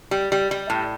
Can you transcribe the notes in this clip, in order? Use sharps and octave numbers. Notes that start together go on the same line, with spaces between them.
G3
G3
G3
A2